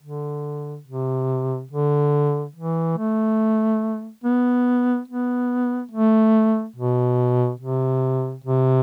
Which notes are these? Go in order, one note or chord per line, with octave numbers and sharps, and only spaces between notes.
D3
C3
D3
E3
A3
B3
B3
A3
B2
C3
C3